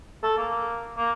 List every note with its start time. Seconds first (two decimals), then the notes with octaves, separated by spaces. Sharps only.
0.23 A4
0.38 A#3
0.97 A#3